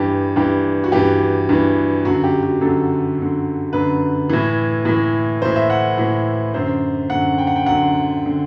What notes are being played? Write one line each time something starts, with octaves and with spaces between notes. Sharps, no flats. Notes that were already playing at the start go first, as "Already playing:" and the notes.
Already playing: G2 E3 G4
G2 E3 G4
F#4
G2 E3 G4
G2 E3
F#2 D3 F#4
G4
F#4
F#2 D3 A4
F#2 D3
F#2 D3 B4
A2 E3
A2 E3
A2 E3 C5
E5
F#5
A2 E3
F#2 D3 C5
F#2 D3 F#5
G5
F#5
G5
F#2 D3 F#5
D3